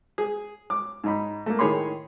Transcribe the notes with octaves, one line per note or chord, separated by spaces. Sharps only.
G#4
D6
G#2 D#4 B5
A3 A#3
A2 D#3 G#4 C#5 B5 C6